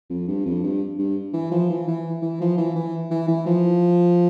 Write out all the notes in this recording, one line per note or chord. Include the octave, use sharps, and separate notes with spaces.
F2
G2
F2
G2
G2
E3
F3
E3
E3
E3
F3
E3
E3
E3
E3
F3